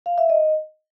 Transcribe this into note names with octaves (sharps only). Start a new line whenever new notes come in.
F5
E5
D#5